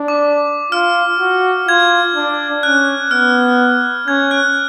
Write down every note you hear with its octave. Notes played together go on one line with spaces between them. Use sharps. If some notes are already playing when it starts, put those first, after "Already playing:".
Already playing: D4
D6
F4 F6
F#4
F4 G#6
D4
C#4 F#6
B3 F6
C#4 G#6
F#6